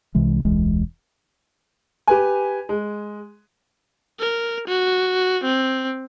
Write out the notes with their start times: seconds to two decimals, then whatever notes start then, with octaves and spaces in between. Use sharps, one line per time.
0.15 C2 C3 E3 G#3
0.45 E1 C#2 E3 G#3
2.07 G4 B4 G#5
2.69 G#3
4.19 A#4
4.67 F#4
5.44 C4